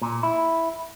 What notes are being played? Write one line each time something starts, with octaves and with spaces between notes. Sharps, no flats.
A#2
E4